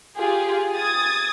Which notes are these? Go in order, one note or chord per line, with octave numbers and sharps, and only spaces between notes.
F4 G4 G#4
D#6 G#6 A6